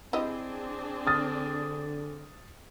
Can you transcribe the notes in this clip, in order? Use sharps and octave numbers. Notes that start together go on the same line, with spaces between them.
C4 D4 E4 G4 G#4 D#5
D3 D#6 F6 A6